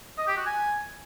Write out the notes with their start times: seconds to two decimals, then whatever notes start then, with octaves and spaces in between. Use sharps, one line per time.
0.18 D#5
0.27 G4
0.37 F#4
0.46 G#5